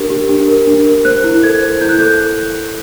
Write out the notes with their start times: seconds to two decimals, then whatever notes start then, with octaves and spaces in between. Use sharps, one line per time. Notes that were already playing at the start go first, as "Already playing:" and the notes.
Already playing: D4 G4 A#4
0.10 G4
0.29 D4
0.48 A#4
0.67 D4
0.86 A#4
1.05 C5 F#6
1.24 E4
1.43 A4 G#6
1.61 C5
1.81 E4 G6
1.89 F#6
1.99 A4 G6